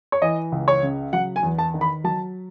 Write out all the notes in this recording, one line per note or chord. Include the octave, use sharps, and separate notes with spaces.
C#5
E3 D#5
C#2
C#5
C#3
F#3 F#5
G#5
E2
A5
D#3
B5
F#3 A5